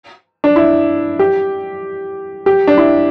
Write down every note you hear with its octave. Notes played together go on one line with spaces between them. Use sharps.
D4
E4
G4
G4
D4
E4